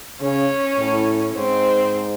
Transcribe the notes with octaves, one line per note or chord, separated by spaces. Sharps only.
C#3 C#4
A2
G#2 C4